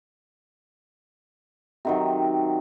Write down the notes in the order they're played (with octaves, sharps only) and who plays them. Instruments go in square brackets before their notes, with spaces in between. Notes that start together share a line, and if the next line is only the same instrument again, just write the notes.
[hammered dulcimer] C3 D#3 F#3